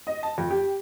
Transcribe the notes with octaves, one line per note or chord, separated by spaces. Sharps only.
D#5
A5
F2
G4